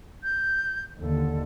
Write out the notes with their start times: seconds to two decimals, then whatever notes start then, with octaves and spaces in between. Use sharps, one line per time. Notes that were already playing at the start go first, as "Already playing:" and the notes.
0.23 G6
1.00 D#2 D3 A4